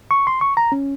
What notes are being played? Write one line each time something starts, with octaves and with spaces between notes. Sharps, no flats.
C#6
C6
C#6
A#5
C#4